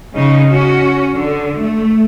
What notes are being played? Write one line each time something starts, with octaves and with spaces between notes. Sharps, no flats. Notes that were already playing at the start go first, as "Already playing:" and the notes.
C#3 D#4
C#4 F#4
D3
A3